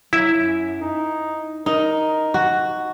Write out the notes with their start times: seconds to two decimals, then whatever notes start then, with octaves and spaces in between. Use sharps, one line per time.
0.13 F#3 E4 E5
0.38 F#2
0.81 D#4
1.66 D#4 A#4
2.34 F#4